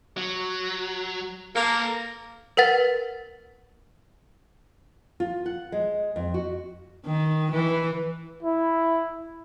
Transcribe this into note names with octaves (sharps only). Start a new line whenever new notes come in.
F#3
A#3 A4 A#5
A#4 B4 F#5 A6
F4
F#5
G#3
F2
F#4
D#3
E3
E4